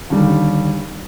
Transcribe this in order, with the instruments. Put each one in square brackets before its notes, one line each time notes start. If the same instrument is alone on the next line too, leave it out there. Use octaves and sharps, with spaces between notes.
[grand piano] D#2 D3 G3